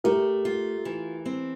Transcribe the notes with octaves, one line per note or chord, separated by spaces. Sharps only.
A3 G4 A#4
F4
E3
C4